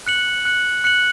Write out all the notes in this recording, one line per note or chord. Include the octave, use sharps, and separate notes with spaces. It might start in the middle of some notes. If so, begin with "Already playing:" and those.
F#6 C#7 F#7
F#6 C#7 F#7
F#6 C#7 F#7